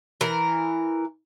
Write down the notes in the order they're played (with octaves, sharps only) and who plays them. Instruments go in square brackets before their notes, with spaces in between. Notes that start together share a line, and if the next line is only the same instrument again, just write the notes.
[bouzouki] E3 A#4